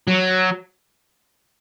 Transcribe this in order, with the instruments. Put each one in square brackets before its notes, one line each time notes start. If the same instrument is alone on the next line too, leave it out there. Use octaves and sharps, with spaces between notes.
[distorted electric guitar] F#3